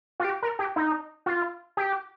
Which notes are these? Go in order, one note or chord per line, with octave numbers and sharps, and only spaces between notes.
F4
G4
A#4
G4
D#4
F4
G4